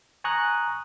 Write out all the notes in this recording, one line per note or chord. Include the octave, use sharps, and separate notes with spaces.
G#5 A#5 C#6 D#6 F#6